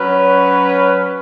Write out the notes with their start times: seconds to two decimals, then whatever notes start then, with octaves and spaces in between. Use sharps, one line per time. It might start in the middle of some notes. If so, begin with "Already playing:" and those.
Already playing: F#3 C#4 B4